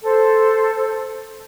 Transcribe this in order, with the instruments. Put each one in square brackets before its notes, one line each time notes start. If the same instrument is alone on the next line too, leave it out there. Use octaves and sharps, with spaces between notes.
[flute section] A4 C5